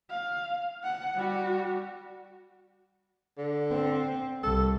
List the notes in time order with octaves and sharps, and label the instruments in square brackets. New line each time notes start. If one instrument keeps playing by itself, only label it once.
[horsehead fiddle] F5
F#5
G3 F#4
[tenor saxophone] D3
[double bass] C4
[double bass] C2 [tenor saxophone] A4